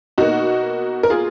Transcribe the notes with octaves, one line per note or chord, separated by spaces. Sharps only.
B2 A#3 D#4 F#4
A#4
F4 G#4